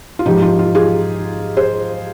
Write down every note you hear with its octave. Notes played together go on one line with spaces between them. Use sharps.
F4
G#2 F3 G#3 D#4 G4
F4
F4
F4 G#4
G#4 C5